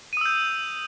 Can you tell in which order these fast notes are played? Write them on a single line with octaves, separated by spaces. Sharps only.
D#7 D#6 E6 G6